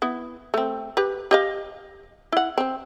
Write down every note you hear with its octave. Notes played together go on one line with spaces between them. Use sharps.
B3 E4
A3 C4
G4 B4
G4 D#5 F5
E4 F#5
C4 C5